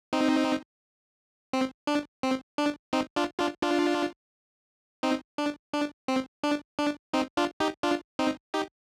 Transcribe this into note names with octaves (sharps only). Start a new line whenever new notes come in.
C4 D#4
C4
D4
C4
D4
C4 D#4
D4 F4
D4 F4
D4 F4
C4 D#4
D4
D4
C4
D4
D4
C4 D#4
D4 F4
D#4 G4
D4 F4
C4 D#4
D#4 G4